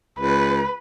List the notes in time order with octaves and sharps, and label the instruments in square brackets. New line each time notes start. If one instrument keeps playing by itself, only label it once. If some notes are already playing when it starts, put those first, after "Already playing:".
[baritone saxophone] C#2 [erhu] B4